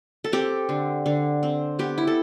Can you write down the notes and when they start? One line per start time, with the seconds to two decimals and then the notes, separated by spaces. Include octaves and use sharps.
0.24 A4
0.33 C4 G4
0.69 D3
1.06 D3
1.43 C4
1.79 B3 G4
1.98 E4
2.07 A4